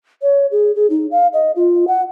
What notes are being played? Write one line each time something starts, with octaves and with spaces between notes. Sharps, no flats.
C#5
G#4
G#4
D#4
F5
D#5
F4
F#5